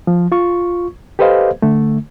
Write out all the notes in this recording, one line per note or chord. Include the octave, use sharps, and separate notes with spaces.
F3
F4 C#6
G4 A4 B4 C5 D#5 F5
D3 A3